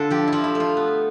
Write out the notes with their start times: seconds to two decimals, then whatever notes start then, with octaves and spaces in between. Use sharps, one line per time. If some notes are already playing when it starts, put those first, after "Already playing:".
Already playing: D3 D4 F4 A4
0.10 F3 G4
0.28 F3 E4
0.44 E4
0.55 A3
0.60 F4
0.77 B3